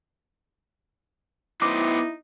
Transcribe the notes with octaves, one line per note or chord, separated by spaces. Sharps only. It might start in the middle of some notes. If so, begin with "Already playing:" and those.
F#3 B3 D#4 E4 C5 D6